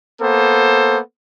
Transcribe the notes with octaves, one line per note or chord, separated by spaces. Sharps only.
A#3 B3 A4 C5